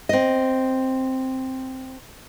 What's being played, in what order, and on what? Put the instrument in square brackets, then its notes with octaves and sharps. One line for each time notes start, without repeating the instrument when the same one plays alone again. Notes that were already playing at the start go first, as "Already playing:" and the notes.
[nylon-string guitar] C4 D#5